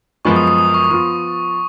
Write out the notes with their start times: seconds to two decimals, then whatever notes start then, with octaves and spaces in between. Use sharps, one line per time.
0.25 F#2 F3 G#3 B3 C#6
0.36 D#6
0.47 D#6
0.58 D#6
0.74 C#6
0.84 C#6
0.90 F3 B3 F4 D#6